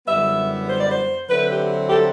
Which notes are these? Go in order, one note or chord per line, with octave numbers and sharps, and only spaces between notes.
F#2 D3 G3 B3 E4 E5
C5
D5
C5
D3 F#3 C4 E4 B4
G4
G4
A4